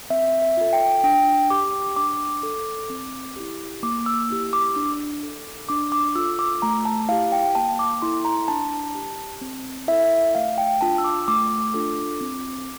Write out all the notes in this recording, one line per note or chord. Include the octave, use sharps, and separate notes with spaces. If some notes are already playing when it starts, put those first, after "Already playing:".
C4 E5
E5
F4 A4
G5
D4 G5
G4 D6
D4 D6
A4
C4
E4 G4
A#3 D6
E6
E4 G4
D6
D4
A4
D4 D6
D6
F4 A4 E6
D6
A3 A#5
A5
E4 G4 F5
G5
A#3 A5
D6
E4 A4 C6
A#5
D4 A5
G4
C4
E4 A4 E5
A3 F5
G5
D4 F4 A5
E6
D6
A3 D6
D4 F4 A4
C4